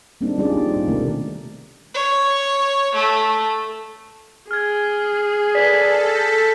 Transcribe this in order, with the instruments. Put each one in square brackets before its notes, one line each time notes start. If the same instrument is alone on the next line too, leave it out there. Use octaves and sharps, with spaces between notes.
[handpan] G3 A#3 C4 D4 D#4
G3 C#4 F4 G#4 D5
C#4 D#4
B2
C3 D#3 A3 C4 A#4
[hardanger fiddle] C#5
A3
[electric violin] G#4 [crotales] F6 G#6
[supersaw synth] A4 [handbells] B4 D5 [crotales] B6
[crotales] G6 [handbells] A#6